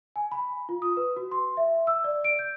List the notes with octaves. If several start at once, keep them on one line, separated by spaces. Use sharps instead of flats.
G#5
B5
F4
D#6
B4
F#4
C6
E5
E6
D5
D7
G6